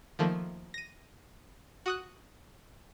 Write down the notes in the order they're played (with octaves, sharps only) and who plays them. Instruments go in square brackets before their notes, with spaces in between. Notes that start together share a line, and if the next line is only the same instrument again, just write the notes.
[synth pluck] D#3 F3 A3 A#3
A#6 D#7
F#4 D#6 F#6